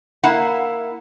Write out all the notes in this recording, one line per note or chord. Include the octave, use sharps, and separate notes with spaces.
A#3 E4 F#5